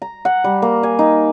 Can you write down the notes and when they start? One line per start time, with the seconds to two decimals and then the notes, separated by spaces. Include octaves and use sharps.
0.02 A#5
0.25 F#5
0.44 G3
0.62 A#3
0.83 G#5
0.99 D#4